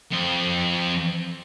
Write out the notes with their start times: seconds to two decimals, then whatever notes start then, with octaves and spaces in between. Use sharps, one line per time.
0.11 F2 C4